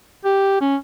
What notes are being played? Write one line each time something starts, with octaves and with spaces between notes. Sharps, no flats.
G4
C#4